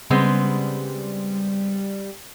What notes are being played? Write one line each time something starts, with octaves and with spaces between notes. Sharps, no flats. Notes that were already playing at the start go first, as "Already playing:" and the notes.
C#3 G3 G#3 B3 C4